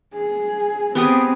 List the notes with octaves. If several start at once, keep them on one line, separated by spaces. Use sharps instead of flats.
G#4
B3 C4 G4 G#4